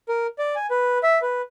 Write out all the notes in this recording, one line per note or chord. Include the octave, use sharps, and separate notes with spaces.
A#4
D5
G#5
B4
E5
B4